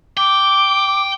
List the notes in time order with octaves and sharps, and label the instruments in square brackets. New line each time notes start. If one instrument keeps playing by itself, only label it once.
[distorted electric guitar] G5 [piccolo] D6